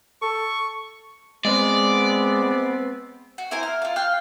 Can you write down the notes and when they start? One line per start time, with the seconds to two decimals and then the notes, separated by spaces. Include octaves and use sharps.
0.22 A4 C#6
1.45 G#3 B3 C4 D5
3.38 F#4
3.51 E4 A#4 C5 G#5
3.63 F6
3.82 F4 F5
3.96 F5 G5 F6 F#6